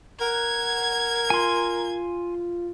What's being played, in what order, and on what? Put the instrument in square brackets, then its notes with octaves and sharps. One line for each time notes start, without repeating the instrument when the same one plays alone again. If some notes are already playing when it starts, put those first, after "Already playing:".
[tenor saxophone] A#4 [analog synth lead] F#5 [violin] G#6
[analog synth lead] F4 [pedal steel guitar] G#5 C6